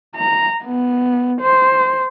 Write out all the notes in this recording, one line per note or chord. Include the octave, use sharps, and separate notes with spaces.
A#5
B3
C5